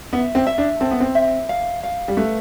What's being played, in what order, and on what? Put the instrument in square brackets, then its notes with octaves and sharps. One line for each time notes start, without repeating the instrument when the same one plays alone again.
[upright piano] B3 [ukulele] E5
[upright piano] C4
[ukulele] E5
[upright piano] D4
[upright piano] C4 [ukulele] A4
[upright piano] B3
C4
[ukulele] E5
F5
F5
[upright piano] G3
[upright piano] A3 [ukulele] B4